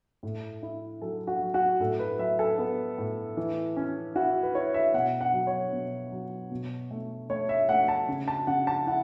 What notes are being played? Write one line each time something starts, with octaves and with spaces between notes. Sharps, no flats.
A2
E4
F#3 A4
F#4
F#3
F#4
A2 A4
B4
F#3 E5
A4
B3
A2
E3
C#4
E4 F#4
B4
E4 C#5
E5
B2 F#5
F#5
F#3
C#5
B2
F#3
B2
A3
A3 C#5
E5
A3 F#5
A5
C#3
A5
C#3 F#5
A5
E4 F#5